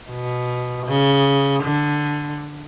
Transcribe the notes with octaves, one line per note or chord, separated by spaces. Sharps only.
B2
C#3
D3